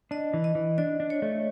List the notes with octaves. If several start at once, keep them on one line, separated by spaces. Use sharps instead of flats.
D4 D#5
E3
D#5
E3
D4 D5
D4
C#5
A3